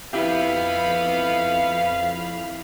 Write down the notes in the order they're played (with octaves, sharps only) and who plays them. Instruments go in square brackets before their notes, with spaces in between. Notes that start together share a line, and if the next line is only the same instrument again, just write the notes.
[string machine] F2 B5 [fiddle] B3 [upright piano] E4 G4 [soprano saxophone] F5